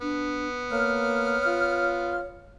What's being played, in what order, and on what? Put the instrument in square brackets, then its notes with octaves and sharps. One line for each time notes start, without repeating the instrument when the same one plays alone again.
[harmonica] B3 [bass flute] D4
[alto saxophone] A#3 [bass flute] C#5 [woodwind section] F6
[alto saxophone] F4